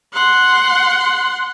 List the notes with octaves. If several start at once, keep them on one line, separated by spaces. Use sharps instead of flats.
F#5 C6